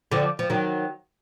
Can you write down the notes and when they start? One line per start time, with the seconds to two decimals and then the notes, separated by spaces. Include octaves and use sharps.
0.12 D3 F3
0.39 F3
0.50 D#3 F#3